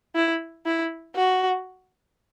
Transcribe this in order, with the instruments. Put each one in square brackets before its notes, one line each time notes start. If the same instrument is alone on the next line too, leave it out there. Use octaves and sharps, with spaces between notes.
[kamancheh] E4
E4
F#4